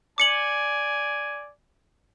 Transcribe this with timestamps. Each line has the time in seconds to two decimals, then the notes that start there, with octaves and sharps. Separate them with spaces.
0.18 D5 G#5 D6 C#7 F#7